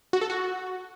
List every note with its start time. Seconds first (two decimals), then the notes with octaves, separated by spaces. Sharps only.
0.13 F#4
0.21 A4
0.30 F#4